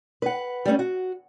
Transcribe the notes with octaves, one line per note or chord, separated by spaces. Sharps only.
B4 F#5
G3 A3 C4 C#4
F#4